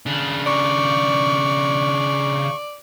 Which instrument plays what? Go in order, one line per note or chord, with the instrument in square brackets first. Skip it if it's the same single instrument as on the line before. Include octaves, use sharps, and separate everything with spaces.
[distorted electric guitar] C#3 D4
[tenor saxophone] D5 [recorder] C#6